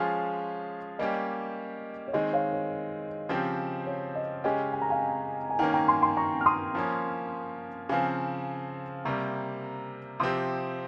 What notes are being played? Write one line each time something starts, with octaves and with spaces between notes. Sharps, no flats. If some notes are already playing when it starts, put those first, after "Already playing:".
Already playing: F3 G#3 C#4 F4 G#4 C#5
G3 A#3 C#4 G4 D#5
C#5
D#3 G#3 C4 D#5
C#5 F5
C#5
C#3 F3 C4 G4
C#5
D#5
C#3 G#3 C#4 G4 D#5 G5
G#5
A#5
F5 G#5
G#5
D#3 A#3 C#4 G5 A#5
G5 A#5
G#5 C6
G#5 C6
A#5 C#6
F6
C6 D#6
F3 A#3 C#4
C#3 F3 C4 F5 G#5
C3 G3 A#3 A#5 C#6
C3 F3 C4 G4 C6 D#6